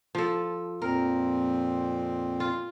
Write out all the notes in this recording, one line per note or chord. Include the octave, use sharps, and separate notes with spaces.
F3 A4
F2 A#2 C4 A#4
F4